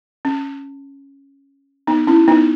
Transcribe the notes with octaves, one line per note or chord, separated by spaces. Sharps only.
C#4
B3 D#4
C#4 E4
B3 D#4